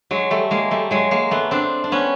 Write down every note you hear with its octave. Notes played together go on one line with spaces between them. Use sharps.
F#3 G#3
G3 A3
G#3 A#3
G3 A3
F#3 G#3
G#3 A#3
A3 B3
C4 D4
D4
B3 C#4